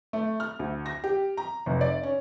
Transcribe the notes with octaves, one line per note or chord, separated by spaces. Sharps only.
A3
F6
D2
A#6
G4
A#5
F1
D5
C#4